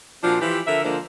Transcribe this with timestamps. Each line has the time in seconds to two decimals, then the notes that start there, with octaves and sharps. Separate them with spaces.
0.24 A#2 F3 C4 D4 F4 F#4
0.41 E3 F3 G4
0.67 D3 F3 A4 A#4 E5
0.84 D3 F3 G#3 A#3 D4 C5